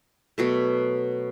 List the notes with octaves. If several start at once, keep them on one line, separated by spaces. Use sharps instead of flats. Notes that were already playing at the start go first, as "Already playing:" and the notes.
B2 F#3 A3